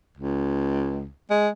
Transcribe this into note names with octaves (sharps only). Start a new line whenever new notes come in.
C#2
G#3